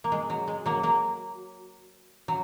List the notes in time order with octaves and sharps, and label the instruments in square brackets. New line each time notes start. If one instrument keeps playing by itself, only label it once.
[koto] A#3
G#3
F#3
G#3
F#3 A#3
F#3 A#3
F#3